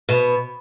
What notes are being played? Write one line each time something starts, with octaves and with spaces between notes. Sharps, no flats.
B2